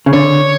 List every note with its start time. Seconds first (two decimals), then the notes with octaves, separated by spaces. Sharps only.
0.06 C#3
0.13 D3 C#5